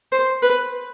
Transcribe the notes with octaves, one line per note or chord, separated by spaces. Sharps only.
C5
B4